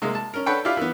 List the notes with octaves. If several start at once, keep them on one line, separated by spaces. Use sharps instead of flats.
C3 G#3 A#3
A5
C#4 A#4
D4 A4 B4 C#5 F#5 G5
E4 F4 G4 D5 F5
E3 B3